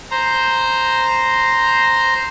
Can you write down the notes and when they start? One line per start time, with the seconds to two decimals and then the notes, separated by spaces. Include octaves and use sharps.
0.11 C5 A#5